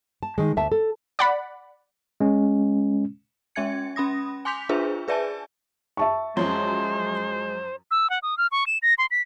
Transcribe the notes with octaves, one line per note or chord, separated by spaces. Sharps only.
A5
D#3 G#3
D2 E5 A5
A4
D5 F#5 B5
G#3 C#4
G#3 C#4 E5 G#5 G#6 C#7
C#4 B5 D#6 A#6
G#5 C6 D6 G6 B6 F7
D4 F4 G#4 B4 C5 E5
G#4 B4 D5 E5 G#5 A5
E5 A5 C#6
F#2 F3 F#3 G#3 C5
E6
F#5
D#6
F6
C#6
E7
A#6
C6
B6